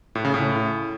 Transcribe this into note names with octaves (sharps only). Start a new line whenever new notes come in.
A2
C#3
A2